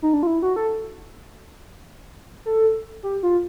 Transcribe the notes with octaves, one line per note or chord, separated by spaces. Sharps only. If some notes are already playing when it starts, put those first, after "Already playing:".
D#4
D4
F4
E4
F#4
A4
A4
G4
F4